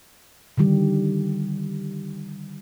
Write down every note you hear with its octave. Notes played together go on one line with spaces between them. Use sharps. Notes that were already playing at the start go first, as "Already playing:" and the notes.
D3 D#3 G3 G4